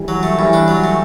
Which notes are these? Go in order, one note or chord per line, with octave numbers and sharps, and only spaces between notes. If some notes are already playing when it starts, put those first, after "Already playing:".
Already playing: E3 G3
F#3
A3
A2 E3 G3
D4
F#3
A3